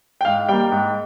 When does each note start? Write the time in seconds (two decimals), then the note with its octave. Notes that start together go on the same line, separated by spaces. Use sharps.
0.21 G5
0.25 G#2 F5
0.49 G3 A#3 G5
0.72 G#2